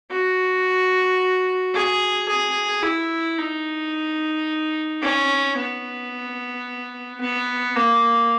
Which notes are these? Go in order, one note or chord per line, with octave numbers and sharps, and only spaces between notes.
F#4
G#4
G#4
E4
D#4
C#4
B3
B3
A#3